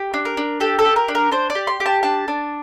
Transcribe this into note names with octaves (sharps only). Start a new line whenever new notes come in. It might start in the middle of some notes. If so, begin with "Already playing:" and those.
Already playing: G4
D4
A#4
D4
G4 A4
A4
G4
A#4
D4
A#4
D4 C5
D5
G4
C6
G4
A5
D4 A5
D4